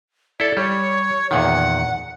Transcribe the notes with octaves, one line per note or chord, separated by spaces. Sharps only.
E4 A4 D5
G3 C#5
E2 A#2 D#3 F#5